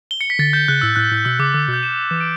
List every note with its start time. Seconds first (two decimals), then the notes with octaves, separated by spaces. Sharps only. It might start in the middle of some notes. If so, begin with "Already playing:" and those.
0.11 G7
0.21 C#7
0.30 B6
0.39 D3 A6
0.53 G6
0.68 C#3 F#6
0.81 A2 E6
0.96 A2 F#6
1.12 A2
1.25 B2 E6
1.39 C#3 D6
1.54 D3 E6
1.68 B2
1.74 G6
1.83 E7
2.11 E3 E7
2.21 D7